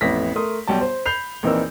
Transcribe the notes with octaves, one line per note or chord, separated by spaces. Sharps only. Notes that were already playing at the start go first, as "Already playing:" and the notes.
A1 F2 B3 E4 A#6 B6
A3 A#4 C6 D#6
B1 G3 G5 A5
C5
B5 G6 C7 F7
A#1 E3 C4 D#4 A#4 E6